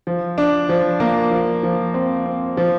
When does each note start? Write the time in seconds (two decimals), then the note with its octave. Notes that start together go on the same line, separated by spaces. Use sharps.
0.07 F3
0.38 D4
0.69 F3
1.00 A#3
1.31 F3
1.63 F3
1.94 C4
2.26 C4
2.57 F3